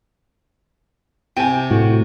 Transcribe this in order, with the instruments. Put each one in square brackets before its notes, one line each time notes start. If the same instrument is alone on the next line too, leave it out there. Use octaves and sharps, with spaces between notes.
[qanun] C3 [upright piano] G5 G#5
[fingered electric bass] A2 [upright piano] F#4